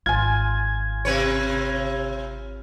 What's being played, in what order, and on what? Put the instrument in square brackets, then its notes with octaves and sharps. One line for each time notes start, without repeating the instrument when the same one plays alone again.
[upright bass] G#1 [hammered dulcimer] F4 G#5 [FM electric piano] G#6
[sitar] C3 B4 C#5